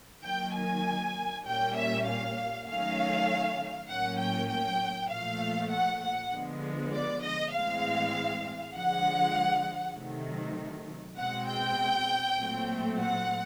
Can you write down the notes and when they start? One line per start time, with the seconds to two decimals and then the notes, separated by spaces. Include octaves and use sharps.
0.24 D#3 F#3 A#3 G5
0.55 G#5
1.46 A#2 G3 A#3 C#4 G5
1.76 E5
2.07 F5
2.67 D#3 F#3 A3 C#4 F5
3.89 A2 F#3 A#3 C#4 F#5
4.20 G5
4.49 G5
5.10 A#2 F3 A3 F5
5.71 F#5
6.02 F#5
6.32 D3 F3 G#3 B3
6.92 D5
7.23 D#5
7.53 A2 E3 G#3 C4 F5
8.74 D3 F3 G#3 F#5
9.95 C3 D#3 F#3 A3
11.17 B2 G#3 C4 F#5
11.48 G5
12.38 A#2 F#3 A3 C4
12.99 F#5